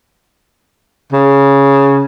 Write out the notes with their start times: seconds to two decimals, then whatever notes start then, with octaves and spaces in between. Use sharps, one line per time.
1.12 C#3